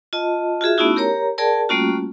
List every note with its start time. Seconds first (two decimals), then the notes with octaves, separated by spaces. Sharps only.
0.13 F4 D#5 A5
0.61 F4 F#4 G#4 E5
0.78 A3 B3 C#4 D#4 E4 F#4
0.96 G4 A#4 C#5 A#5
1.38 G#4 A#4 D5 G5 A5
1.69 G3 A3 A#3 C#4 F4 F#4